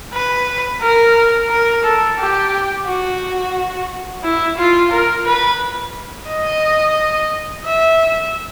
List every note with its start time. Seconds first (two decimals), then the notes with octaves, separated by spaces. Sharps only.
0.13 B4
0.81 A#4
1.50 A#4
1.84 A4
2.19 G4
2.86 F#4
4.24 E4
4.57 F4
4.91 A#4
5.26 B4
6.28 D#5
7.65 E5